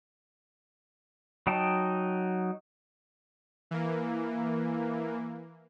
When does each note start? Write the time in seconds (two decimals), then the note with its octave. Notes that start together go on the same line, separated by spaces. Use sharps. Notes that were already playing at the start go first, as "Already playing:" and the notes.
1.47 F#3 D#4 G5 A5
3.71 E3 A#3